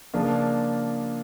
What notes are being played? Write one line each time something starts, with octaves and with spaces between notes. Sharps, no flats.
C#3 F3 A#3 D4 F4